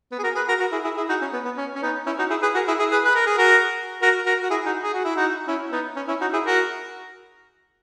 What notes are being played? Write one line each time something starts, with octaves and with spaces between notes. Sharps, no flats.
B3
G#4
F#4 A#4
G#4 B4
F#4 A#4
F#4 A#4
E4 G#4
E4 G#4
E4 G#4
D#4 F#4
C#4
B3
B3
C#4
C#4
B3 D#4
C#4 E4
D#4 F#4
E4 G#4
G#4 B4
F#4 A#4
E4 G#4
E4 G#4
G#4 B4
B4
A#4
G#4
F#4 A#4
F#4 A#4
F#4 A#4
F#4
E4 G#4
D#4 F#4
G#4
F#4
E4
D#4 F#4
C#4 E4
B3 D#4
C#4
C#4 E4
D#4 F#4
E4 G#4
F#4 A#4